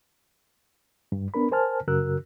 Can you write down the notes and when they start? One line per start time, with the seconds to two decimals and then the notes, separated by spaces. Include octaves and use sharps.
1.12 G2
1.34 B3 D4 A#4 B5
1.51 A#4 C5 G#5 A5 F6
1.88 F#2 C#3 F#4 A#4 E6 F#6